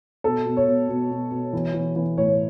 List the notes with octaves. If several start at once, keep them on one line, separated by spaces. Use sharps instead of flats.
B2 A4
B2
C#5
B2
B2
B2
B2
E3
E3
E3
A2 C#5